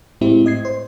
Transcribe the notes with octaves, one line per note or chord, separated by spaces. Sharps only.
A2 G#3 C4 E4 G4
A2 D#5 G#6 C7
C5